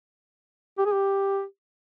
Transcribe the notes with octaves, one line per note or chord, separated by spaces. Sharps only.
G4
G#4
G4